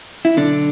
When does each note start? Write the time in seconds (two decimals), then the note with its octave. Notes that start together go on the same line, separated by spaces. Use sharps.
0.25 E4
0.37 B1 D3 D4